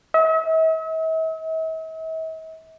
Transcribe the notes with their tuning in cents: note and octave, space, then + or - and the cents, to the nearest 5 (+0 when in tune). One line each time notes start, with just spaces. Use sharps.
E5 -45